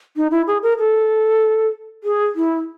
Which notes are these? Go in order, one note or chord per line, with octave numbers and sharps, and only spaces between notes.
D#4
E4
G#4
A#4
A4
G#4
E4